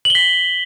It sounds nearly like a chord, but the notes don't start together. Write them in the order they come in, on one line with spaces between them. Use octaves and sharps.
F#7 G7 B6